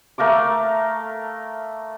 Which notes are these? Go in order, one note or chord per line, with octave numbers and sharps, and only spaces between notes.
A3 A#4 F5 D6